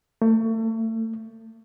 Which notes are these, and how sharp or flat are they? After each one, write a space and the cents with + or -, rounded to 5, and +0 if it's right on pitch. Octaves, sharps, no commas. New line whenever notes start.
A3 +35